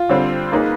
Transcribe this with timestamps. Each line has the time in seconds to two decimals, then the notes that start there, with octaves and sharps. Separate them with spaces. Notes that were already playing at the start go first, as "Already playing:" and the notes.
Already playing: F4
0.09 D3 G3 C4
0.52 A#3 D#4 G#4 B4